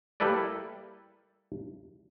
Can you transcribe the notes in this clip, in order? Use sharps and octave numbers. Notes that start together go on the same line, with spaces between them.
G3 A#3 E4 A4 B4 D5